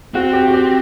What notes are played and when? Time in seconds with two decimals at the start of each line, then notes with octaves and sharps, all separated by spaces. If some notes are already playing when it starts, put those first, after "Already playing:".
0.14 C4 F#4
0.33 G4
0.48 F#4
0.53 G4